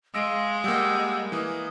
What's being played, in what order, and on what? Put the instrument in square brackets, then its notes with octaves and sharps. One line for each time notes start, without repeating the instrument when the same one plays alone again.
[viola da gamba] G#3 [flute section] F5 C6 [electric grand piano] E6 A#6 D7
[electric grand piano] G3 A#3 [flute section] F#5 E6 G6
[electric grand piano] E3 A#3 [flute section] D#6